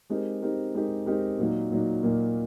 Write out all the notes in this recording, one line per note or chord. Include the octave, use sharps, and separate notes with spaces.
G#3 C4 D#4 G4 A#4
G#3 C4 D#4 G4 A#4
G#3 C4 D#4 G4 A#4
G#3 C4 D#4 G4 A#4
A#2 F#3 A#3 D#4
A#2 F#3 A#3 D#4
A#2 F#3 A#3 D#4